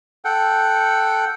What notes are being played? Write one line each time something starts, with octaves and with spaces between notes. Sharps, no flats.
A4 F#5 G5